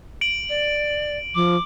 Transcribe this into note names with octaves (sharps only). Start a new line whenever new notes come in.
D7 F#7
D5
F3 D6